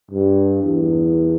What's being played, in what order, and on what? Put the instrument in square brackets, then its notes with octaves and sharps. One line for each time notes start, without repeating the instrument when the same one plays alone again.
[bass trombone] G2
E2